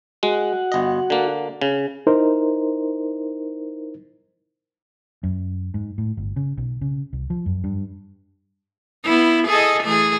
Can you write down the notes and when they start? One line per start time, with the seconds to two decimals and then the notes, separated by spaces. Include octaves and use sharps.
0.23 G#3 F#4 F#5
0.72 G1 D#5
1.10 D3 A#3
1.62 C#3
2.07 D#4 E4 A#4 C5
5.23 F#2
5.74 G#2
5.98 A2
6.17 G1
6.36 C#3
6.58 B1
6.81 C#3
7.13 C2
7.30 F3
7.46 F#2
7.64 G2
9.04 B3 E4
9.48 G#4 A4 D#5
9.84 E3 A3 G#4